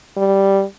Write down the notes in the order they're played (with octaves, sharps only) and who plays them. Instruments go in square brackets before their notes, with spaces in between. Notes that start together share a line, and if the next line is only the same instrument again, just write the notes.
[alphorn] G3